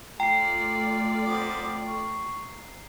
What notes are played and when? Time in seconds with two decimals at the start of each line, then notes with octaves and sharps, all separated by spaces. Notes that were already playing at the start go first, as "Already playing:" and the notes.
0.20 A3 F4 D5 G5 A#5 C7
1.25 B3 C4 D6
1.88 C#6